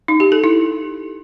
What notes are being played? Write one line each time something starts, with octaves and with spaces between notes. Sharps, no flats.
D#4
G4
A4
E4